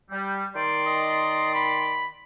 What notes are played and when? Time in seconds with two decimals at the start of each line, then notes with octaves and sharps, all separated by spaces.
0.10 G3
0.55 D#3 D5 C6
0.87 D#5
1.55 B5